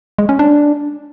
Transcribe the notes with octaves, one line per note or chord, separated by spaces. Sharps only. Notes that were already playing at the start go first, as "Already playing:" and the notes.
G#3
C#4
D4